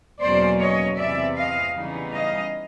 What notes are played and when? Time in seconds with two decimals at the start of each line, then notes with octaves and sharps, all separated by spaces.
0.20 E2 B2 F#3 A#3 C#4 C5 D5
0.59 C#5 D#5
0.97 E2 C3 E3 D5 E5
1.36 D#5 F5
1.74 C#3 E3 G3 B3 D#4
2.13 D#5 F5